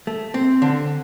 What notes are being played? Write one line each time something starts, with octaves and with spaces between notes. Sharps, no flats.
A3
C4
D3